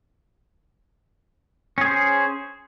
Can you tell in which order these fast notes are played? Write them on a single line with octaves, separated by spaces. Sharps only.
C#4 G#4 C5